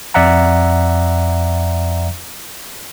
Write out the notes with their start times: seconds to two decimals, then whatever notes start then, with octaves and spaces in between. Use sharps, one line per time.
0.14 F2 D5 E5 F#5 A#5